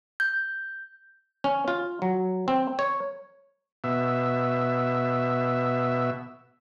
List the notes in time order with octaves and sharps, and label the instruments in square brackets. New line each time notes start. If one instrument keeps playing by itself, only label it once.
[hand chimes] G6
[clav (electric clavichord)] C#4
F4
F#3
C4
C#5
[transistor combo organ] B2 E5